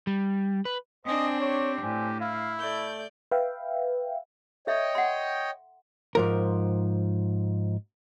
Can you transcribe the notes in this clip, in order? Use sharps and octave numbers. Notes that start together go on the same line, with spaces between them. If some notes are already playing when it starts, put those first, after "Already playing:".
G3
B4
C4 D4 C5 D#5 G5 G#5
G4 C#5
A2 C4 D4 G#5
E4 F5
A3 D5 G6
B4 E5 F5 G5
A4 C#5 D#5 E5 G5
F#5 C6
G#2 F3 A#4